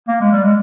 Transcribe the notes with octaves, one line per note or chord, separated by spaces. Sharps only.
A#3
G#3
G3
G#3